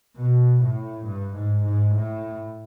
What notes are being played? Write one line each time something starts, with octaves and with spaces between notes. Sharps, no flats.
B2
A2
G2
G#2
G#2
A2